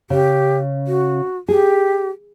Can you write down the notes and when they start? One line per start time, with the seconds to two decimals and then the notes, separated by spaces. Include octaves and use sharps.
0.10 C#3 G4
0.87 F#4
1.48 G4 G#4